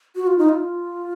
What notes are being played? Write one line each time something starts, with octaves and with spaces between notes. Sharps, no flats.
F#4
F4
D#4
F4